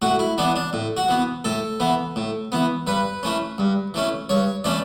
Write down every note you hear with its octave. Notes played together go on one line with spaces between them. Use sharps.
A2 F#4
E4
E3 B3 D4
D4
A2
F#4
E3 B3
A2 A4
E3 B3
A2
E3 B3
G2 B4
E3 A3 C#4
G2
E3 A3 C#4
G2 C#5
E3 A3 C#4 D5